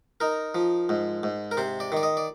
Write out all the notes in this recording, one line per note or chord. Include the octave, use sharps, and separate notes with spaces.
D#4 A#4
F3
G#2
G#2
A#4
C3 C5
D5
D#3 D5
D#5
D5